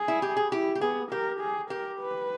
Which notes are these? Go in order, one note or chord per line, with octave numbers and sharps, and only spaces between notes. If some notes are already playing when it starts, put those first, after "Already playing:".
Already playing: G#4
E4
G4
G#4
E4 G4
G4
B3 G#4
G4 A#4
G#4
G4 A#4
B4